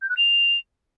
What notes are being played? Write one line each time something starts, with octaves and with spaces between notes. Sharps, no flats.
G6
F#6
F7